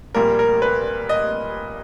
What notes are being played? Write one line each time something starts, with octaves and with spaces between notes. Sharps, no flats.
A#1 A#2 G3 A#3 A#4
A#4
B4
D#5